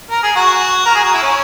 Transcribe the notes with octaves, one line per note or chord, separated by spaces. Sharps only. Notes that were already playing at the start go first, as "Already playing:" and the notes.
A#4
G#4
F#4
A#4
G#4
F#4
E4
C#4